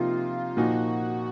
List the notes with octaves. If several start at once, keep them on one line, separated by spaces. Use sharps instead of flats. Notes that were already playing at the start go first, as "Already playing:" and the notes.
Already playing: C3 F3 A#3 D#4 F4
A#2 F3 A#3 D#4 F#4